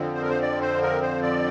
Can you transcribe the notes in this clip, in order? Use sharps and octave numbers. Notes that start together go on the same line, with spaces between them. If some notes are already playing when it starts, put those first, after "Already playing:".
Already playing: F2 D3 F3 C4
C5
A#4
C5
D5
C5
A#4
C5
D5